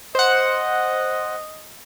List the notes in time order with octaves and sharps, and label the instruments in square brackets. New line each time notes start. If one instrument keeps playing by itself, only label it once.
[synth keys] C5 F#5 [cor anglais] D#5